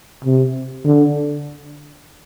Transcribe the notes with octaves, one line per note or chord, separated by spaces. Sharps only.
C3
D3